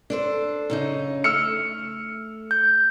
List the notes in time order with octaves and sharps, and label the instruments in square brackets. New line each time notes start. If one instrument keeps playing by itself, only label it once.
[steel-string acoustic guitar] D4 A4 C5
F#2 C#3 D#4
[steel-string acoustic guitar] A3 [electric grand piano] E6 F6 C#7
[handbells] G6